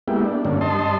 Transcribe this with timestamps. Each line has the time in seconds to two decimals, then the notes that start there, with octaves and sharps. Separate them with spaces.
0.08 G#3 A#3 B3 E4 G4
0.25 D4
0.45 G2 D3 A#3 C#4 D4
0.61 G2 D#5 A5 C6